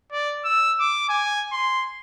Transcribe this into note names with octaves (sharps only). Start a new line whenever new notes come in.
D5
E6
D6
G#5
C6